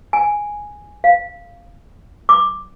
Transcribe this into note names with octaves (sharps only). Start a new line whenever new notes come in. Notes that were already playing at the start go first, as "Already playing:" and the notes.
G#5
F5
D6